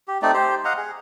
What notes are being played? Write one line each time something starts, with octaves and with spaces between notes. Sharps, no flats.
G4
A3 C4 D#4 D5
G4 C5
D#5 F5 F#5 A#5
G#4